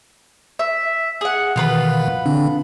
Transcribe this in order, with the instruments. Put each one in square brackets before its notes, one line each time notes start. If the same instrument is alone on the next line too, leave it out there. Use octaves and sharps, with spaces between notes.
[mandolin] E5
G#4 F#5
[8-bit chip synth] B2 D#3 E3 [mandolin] B3 F4 B4
[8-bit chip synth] D3 C4 D4